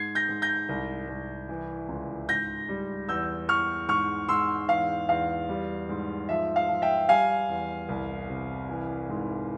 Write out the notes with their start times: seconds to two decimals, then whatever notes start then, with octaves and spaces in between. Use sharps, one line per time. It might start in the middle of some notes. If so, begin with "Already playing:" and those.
Already playing: G#2 G#6 C7
0.15 G6 A#6
0.29 G#2
0.42 G6 A#6
0.69 C2
1.09 C2
1.49 E3
1.89 C#2
2.29 G#2 G6 A#6
2.69 G3
3.09 E2 E6 G6
3.49 E2 C#6 F6
3.88 G#2 C#6 F6
4.28 G#2 C6 E6
4.69 E2 F5
5.09 E2 F5
5.49 G3
5.89 G#2
6.29 F3 E5
6.56 F5
6.69 F3
6.82 E5 G5
7.09 G3 F5 G#5
7.49 E2
7.89 C2
8.29 C3
8.69 E3
9.09 G#2